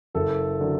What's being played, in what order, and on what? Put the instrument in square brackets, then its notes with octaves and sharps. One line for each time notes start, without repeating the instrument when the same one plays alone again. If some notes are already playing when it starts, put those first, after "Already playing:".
[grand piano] F#1 A4
D3 F#3